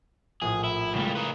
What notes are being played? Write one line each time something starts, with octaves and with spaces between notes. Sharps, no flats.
A#1 A2 G#4
E4
G#2 C#3 G3 A3 A#3
D#4 B4